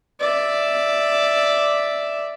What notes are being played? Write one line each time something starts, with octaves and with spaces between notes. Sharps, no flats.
D5 E5